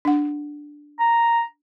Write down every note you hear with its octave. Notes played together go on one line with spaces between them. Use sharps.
D4 F#5
A#5